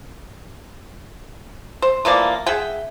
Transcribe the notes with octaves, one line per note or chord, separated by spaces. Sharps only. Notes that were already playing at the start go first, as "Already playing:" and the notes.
C5
E3 F3 A#3 D5
G#4 E5 F#5 G5